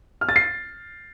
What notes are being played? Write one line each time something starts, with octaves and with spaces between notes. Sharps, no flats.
F6
A6
C7